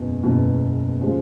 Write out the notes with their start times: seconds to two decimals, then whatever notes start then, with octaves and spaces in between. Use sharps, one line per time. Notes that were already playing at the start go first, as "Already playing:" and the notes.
Already playing: F#1 E2 B2
0.23 F#1 E2 B2
1.00 C#3 F3 G#3